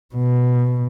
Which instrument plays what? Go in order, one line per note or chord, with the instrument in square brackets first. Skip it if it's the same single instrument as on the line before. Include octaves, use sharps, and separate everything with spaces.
[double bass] B2